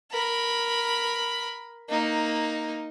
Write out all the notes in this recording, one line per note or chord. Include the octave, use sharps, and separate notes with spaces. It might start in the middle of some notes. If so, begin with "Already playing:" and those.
A#4 B5
A#3 D#4